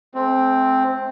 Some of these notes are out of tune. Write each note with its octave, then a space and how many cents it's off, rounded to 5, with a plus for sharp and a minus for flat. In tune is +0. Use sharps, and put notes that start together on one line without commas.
A3 -45 C4 +0